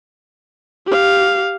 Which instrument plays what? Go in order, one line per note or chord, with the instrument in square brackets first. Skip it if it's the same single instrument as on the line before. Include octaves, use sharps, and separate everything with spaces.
[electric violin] G4 F5